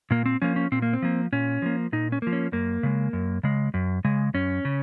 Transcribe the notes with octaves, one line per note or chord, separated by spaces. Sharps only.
A#2 A#3
C4
F3 A#3 C#4
C#4
A#2 C4
A#3
C4
F3 A#3
A#2 C#4
F3 A#3
A#2 D#4
C#4
F3 A#3
C#4
F#2 A#3
C#3 G#3
F#2
C#3 G#3
F#2
C#3 G#3
F#2 C#4
C#3